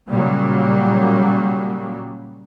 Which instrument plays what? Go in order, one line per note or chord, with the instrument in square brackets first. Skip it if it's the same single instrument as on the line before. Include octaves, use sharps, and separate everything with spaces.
[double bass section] A#2 C#3 F#3 G3 A#3